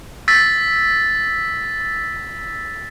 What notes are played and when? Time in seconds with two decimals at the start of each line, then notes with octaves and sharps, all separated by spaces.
0.28 E6 A6 B6